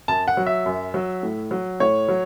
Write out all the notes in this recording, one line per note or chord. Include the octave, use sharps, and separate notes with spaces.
F#2 A5
F#5
F#3
E5
F#2
F#3
A2
F#3
A2 C#5
F#3